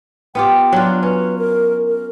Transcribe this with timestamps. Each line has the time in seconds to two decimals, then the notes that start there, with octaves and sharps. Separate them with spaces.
0.35 B3 F4 G4 G5
0.72 F#3 D4 F4
1.03 C#4 B4
1.38 A#4
1.86 A#4